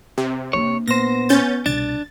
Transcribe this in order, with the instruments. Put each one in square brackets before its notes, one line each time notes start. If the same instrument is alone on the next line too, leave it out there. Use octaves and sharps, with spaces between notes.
[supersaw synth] C3
[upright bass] A#3 D4 [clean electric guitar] C#5
[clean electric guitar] A#2 C5 [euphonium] B3 [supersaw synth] A#6
[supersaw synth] C#4 G6 A6
[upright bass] C2 B2 [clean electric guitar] D4 [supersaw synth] A6